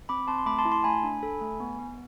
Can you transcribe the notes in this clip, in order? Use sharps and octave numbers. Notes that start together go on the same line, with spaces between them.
C4 B5 D6
C4 A5 C6
C6
A3 B5 D6
A5 C6
E4
A5 C6
A3 G#5 B5
D4
A4
A3
B3
B3